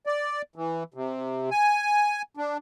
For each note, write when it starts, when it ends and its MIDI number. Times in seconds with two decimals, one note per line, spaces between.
0.06 0.42 74
0.56 0.84 52
0.94 1.50 48
1.51 2.22 80
2.37 2.57 62